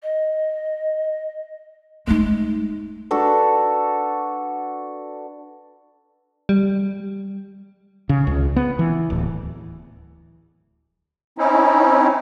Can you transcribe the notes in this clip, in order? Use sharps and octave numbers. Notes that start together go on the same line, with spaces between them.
D#5
G#3 A3 D#4
D4 F#4 A4 B4
G3
C#3
C#2
B3
E3
D1
C4 C#4 D#4 E4